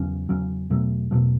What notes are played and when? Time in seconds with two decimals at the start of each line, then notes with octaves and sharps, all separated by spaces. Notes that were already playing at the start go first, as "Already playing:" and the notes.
Already playing: E2 C#3 F#3 C#4
0.29 E2 C#3 F#3 C#4
0.70 E2 B2 F#3 A3
1.11 E2 B2 F#3 A3